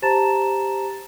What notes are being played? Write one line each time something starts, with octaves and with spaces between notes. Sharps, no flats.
G4 C5 A5 A#5 A6 E7